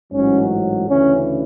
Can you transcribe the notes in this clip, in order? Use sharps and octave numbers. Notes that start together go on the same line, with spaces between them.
A1 G#2 F#3 C#4
D2 C#3 E3 C#4